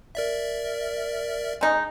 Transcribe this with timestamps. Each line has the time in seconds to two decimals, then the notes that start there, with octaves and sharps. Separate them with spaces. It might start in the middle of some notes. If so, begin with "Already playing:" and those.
0.15 A#4 D5 E5
1.61 G#3 D#4